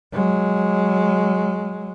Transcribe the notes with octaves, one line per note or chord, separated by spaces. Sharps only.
F#3 G#3